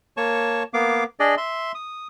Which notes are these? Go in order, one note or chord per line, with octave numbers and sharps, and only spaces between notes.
A#3 C#5 A5 C#6
A#3 B3 F5 D6
D4 G#4 D5 D#5
E5 C6
D#6